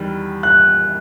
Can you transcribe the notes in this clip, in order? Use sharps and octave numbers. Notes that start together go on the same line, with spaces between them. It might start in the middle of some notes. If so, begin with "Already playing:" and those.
Already playing: E2 D#3 G3
F#6